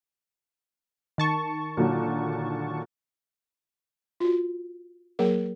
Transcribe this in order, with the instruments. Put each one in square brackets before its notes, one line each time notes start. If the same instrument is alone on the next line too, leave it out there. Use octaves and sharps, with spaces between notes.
[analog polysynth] D#3 A5 C#6
[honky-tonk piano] A#2 D3 F#3
[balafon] F4 F#4
F#3 A#3 G#4 A#4